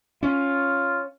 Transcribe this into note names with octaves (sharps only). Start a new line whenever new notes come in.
C#4 F4